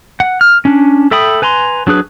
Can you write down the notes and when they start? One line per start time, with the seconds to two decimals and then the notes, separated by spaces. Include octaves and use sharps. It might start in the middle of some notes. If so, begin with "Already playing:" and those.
0.20 F#5
0.41 F6
0.65 C#4 D4
1.11 A4 E5 G5 B5 D#6
1.42 B4 G#5 A#5 C6
1.87 F#3 D4 G#4 B4